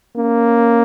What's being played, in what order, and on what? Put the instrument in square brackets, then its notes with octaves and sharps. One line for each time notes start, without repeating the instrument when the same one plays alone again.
[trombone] A#3 [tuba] C#4